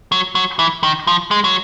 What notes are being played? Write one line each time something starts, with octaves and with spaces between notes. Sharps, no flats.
F#3
F#3
E3
D#3
F3
G#3
F#3